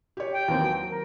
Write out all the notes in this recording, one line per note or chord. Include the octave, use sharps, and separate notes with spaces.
G4 C#5
G5
D#2 E3 C4
F#3
A#4